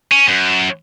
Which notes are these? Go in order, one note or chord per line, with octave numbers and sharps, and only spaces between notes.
C#4
F#2